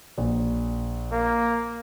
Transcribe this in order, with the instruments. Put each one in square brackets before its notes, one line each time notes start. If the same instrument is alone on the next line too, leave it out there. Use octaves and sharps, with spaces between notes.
[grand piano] A#1
[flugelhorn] A#3